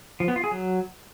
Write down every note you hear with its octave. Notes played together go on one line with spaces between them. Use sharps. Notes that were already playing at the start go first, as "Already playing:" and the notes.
F3
B3
F4
G#4
F#3